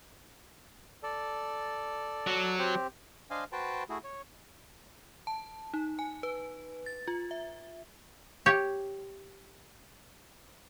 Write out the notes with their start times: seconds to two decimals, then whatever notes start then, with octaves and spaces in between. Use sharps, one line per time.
1.03 A4 D5
2.27 F#3
2.58 C4 G4
3.31 D4 C5 D#5 F5 G#5
3.52 F#4 B4 C5 G5 A5
3.90 A3 E4 F#4 G#4
4.04 C#5
5.27 A5
5.74 D#4
5.99 G#5
6.23 B4
6.86 A6
7.08 F4
7.31 E5
8.46 G4 C#5